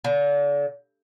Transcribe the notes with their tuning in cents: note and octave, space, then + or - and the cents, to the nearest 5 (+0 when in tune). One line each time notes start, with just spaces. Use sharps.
D3 -35